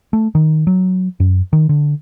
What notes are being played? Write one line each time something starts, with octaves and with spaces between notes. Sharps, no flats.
A3
D#3
F#3
F#2
D#3
D3